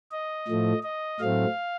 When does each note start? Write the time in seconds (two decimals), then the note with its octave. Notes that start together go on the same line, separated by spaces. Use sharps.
0.12 D#5
0.47 A2 F3 A3
0.83 D#5
1.20 A2 F#3 A3 C4 F5